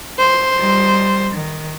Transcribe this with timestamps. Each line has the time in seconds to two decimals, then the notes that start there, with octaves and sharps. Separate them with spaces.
0.18 C5
0.57 G3 D#4
1.32 D#3